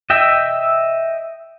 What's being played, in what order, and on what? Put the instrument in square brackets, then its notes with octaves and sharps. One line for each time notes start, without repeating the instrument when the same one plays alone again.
[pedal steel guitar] D#5 E5 G5